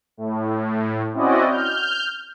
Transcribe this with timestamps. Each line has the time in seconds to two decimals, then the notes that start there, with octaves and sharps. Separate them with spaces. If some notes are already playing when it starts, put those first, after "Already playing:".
0.17 A2
1.13 C4 C#4 E4 F#4 D5 D#5
1.48 F6 G6